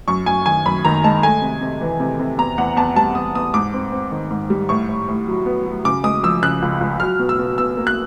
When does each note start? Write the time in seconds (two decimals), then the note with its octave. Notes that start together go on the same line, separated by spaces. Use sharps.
0.08 F#2 C#6
0.26 F#2 G#5
0.46 D#3 G#5
0.66 F#2 B5
0.85 D#3 A#5
1.04 G#3 A5
1.23 A3 G#5
1.42 C3
1.61 C3
1.81 E3
2.00 C3
2.19 C3
2.38 E2 A#5
2.58 E2 F#5
2.76 E2 A5
2.96 G3 A5
3.15 E2 D#6
3.35 E2 D#6
3.54 G#2 D6
3.74 C4
3.92 C4
4.12 D#3
4.31 G#2
4.50 G3
4.69 A2 C#6
4.89 A2
5.08 A2
5.27 F#3
5.46 B3
5.66 F#3
5.85 C#3 D6
6.04 G#3 D#6
6.23 F3 E6
6.42 C#3 F#6
6.62 C#2
6.81 C#2
7.00 F#3 F6
7.19 B2
7.29 E6
7.39 B2
7.58 B2 E6
7.77 A#3
7.87 F#6